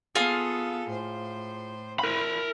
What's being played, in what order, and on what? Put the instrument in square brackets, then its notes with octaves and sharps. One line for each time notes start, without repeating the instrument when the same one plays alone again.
[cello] B3 A4 [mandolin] F4 G#4 F5
[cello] A2 C5
[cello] E4 [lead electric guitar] A#4 B5